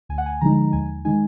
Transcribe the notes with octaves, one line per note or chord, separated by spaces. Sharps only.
D2 G#5
F#5
G#5
D3 F3 G#3 D#4 A#5
D#2 G#5
D#3 G#3 D#4 G#5